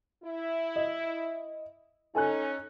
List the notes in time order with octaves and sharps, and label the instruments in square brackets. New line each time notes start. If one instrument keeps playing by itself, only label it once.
[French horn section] E4
[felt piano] D#5
[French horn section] C#4 D#4 [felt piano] A4 G#5 F#6